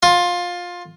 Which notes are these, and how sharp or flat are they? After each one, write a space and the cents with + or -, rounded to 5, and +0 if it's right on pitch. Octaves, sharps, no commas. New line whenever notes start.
F4 +15